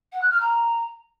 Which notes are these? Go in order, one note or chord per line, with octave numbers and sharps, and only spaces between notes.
F#5
F#6
F6
A#5